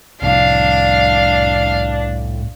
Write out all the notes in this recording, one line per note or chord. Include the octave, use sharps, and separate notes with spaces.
C2 F2 A2 G3 D4 F5